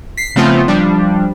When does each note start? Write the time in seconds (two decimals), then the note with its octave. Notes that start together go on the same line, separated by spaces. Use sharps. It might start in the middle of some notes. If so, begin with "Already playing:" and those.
0.17 B6 C7
0.36 C#3 F3 A3 B3 C4 F4
0.68 F3 G3 D4